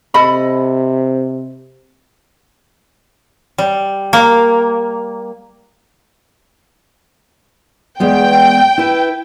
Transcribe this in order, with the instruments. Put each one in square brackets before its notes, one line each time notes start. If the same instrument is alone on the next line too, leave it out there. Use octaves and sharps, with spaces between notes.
[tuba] C3 [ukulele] A4 D#5 B5
[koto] G3
A#3
[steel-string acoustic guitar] E2 G#3 B3 [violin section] G5
[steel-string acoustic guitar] E4 B4